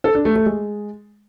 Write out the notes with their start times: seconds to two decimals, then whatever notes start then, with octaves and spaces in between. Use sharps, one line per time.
0.04 A4
0.15 D4
0.25 A3
0.36 A3
0.46 G#3